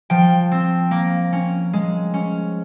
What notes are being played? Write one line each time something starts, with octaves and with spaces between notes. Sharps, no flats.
F3 G5
C4
A#3
C#4
G#3
C#4